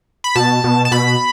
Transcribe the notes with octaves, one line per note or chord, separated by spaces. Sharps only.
B5
B2 A5
B2
A5
B2 B5